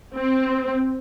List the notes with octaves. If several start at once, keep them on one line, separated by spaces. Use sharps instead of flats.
C4